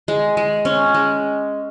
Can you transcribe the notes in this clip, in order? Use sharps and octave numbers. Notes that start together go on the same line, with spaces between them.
G#3
G#3
C#4
G#3